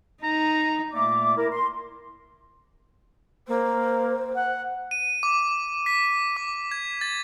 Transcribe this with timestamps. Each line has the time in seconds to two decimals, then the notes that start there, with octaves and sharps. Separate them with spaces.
0.23 D#4 A#5
0.93 A#2 A3 A#3 D5 E5 D6
1.37 E4 A#4
1.52 C6
3.48 A#3 C5
4.35 F#5
4.91 D#7
5.23 D6
5.86 B6
6.37 D6
6.71 G#6
7.01 A6